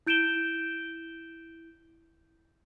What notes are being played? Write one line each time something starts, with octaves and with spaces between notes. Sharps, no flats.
E4 G6 D7 E7 G7